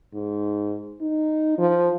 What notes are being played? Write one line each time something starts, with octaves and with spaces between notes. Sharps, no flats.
G#2
D#4
F3